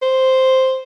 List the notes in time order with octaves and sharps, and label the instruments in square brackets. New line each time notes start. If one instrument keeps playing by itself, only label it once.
[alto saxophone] C5